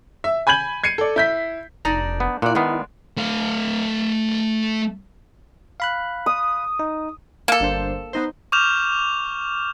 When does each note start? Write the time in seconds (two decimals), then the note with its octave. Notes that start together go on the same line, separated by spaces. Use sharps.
0.24 E5
0.47 G#5 B5 G6 G#6 F#7
0.84 G#6 C7 C#7 D#7
0.98 A4 D5
1.16 E4 G6 B6
1.85 F1 D4 D#4 D5 A#5
2.20 B3
2.42 A#2 E4 F#4 D5
2.55 D#3 G#3 B3 D5
3.17 A3 F5
5.80 F5 B5 F#6
6.26 D#6
6.79 D#4
7.48 A#3 A4 C#7
7.60 G1 D4 C5
8.13 B3 D#4 C5
8.52 C#6 D6 F6 G6 E7 F7